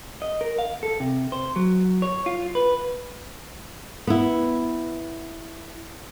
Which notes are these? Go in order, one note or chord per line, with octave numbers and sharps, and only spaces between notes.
D#5
A#4
F5
A4
C3
C5
F#3
C#5
F4
B4
B3 E4